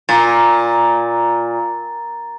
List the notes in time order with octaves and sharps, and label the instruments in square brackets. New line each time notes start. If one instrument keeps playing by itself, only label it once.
[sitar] A#2 [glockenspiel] A#5 A6